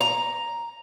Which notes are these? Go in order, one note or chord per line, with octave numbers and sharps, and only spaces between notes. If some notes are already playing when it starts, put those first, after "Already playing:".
A#5